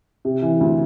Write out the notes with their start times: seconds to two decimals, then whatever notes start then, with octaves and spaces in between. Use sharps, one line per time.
0.25 C3
0.42 E3
0.61 D2